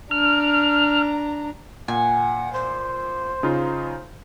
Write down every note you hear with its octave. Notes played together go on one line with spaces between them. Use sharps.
D4 A#5 F6
A#2 F#5 G#5
C5
C#3 D#4 F4